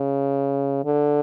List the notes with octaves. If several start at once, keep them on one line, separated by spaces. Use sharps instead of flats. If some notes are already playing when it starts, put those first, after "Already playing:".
Already playing: C#3
D3